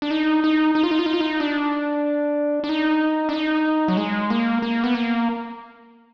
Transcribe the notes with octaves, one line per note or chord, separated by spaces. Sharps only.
D4
D#4
D#4
D#4
F4
D#4
F4
D#4
F4
D#4
D4
D4
D#4
D4
D#4
F#3
G#3
A#3
A#3
B3
A#3